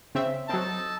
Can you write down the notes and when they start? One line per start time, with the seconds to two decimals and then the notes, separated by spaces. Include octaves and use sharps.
0.15 C#3 C4 E5
0.49 F#3 C4 D#4 A4 A5